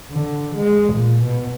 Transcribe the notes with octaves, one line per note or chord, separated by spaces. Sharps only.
D3
G#3
A#2
B2